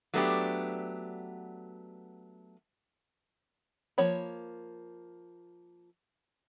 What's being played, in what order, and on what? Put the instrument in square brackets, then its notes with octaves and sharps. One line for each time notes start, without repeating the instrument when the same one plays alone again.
[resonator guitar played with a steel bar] F#3 A3 B3 D4 G4
[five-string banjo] F3 A#3 C#5 B5